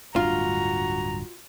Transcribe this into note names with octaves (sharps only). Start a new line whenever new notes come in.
D1 G2 D4 F4 F#4 A#5